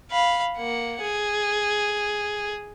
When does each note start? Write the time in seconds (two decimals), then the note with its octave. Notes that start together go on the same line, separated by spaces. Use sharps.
0.11 F5 B5
0.58 A#3 F#5
1.01 G#4